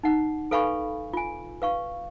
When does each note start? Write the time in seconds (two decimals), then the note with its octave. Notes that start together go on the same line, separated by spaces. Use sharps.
0.03 D#4 F#5
0.51 A4 B4 F5 G#5 B5 C#6
1.14 F4 G#5
1.62 B4 F5 C#6